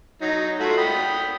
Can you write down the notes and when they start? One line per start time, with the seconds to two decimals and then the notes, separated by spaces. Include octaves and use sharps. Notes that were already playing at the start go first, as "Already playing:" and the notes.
0.21 F#3 D#4
0.60 A3 F4 F#4
0.78 G5 B5 D#6